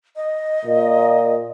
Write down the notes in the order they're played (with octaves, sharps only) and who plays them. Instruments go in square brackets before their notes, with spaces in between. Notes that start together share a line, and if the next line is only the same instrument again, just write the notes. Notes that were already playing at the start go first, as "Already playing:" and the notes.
[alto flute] D#5
[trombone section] A#2